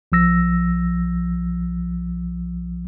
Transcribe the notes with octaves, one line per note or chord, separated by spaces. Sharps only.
B1 F3 E6 A#6